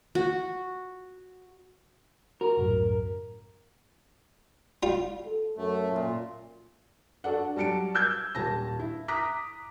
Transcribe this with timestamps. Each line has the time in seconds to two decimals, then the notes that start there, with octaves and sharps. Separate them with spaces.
0.15 F#4
2.41 F#4 A#4
2.57 C#2 F#2 A2
4.83 G3 F4
5.26 A4
5.57 F#2 A3
5.89 A#2
7.24 D4 F#4 A4 D5 F#5
7.56 F#3 G3 A5 C#7 D7
7.95 E6 G6 G#6
8.35 D#1 A5 A#6
8.79 E4
9.08 A#5 D6 D#6 F#6 A#6 B6